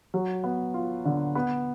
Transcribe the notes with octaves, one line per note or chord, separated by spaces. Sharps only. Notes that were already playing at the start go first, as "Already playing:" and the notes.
F#3
B3
F4
D3
B3